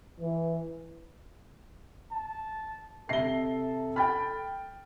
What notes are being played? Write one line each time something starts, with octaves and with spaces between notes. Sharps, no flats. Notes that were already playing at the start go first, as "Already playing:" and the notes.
E3
A5
C3 A4 E5 A#6 C7 G7
G5 B5 F6 A6